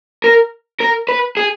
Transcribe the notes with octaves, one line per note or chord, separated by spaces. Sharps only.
A#4
A#4
B4
G#4